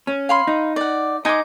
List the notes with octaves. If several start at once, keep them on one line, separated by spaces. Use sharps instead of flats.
C#4
F5 B5 C6
D#4
D5 F#5
D#4 D#5 G#5 D6